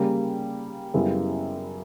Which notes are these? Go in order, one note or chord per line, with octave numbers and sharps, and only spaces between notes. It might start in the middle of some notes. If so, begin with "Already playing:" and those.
Already playing: C#3 G3 A#3
F#2 C#3 G3 B3 E4